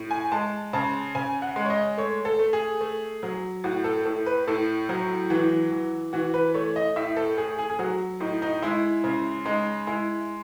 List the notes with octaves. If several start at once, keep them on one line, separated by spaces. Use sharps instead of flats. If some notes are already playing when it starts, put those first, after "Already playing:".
Already playing: A2
G#5
G#3 A5
C#3 A5
C#3 G#5
F#5
G#3
C#5
D#5
A3 C#5
A4
A3
G#4
A3
F#3
A2 F#4
A4
A2 A4
B4
A2 A4
F#3
E3 F#4
E3
E3 F#4
B4
A3 C#5
D#5
A2 E5
A4
A3 G#4
G#4
G#4
F#3 F#4
A2 D#4
D#4
G#3 E4
C#3
G#3 D#4
G#3 E4